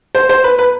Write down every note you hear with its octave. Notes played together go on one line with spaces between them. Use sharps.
C5
C5
B4
B4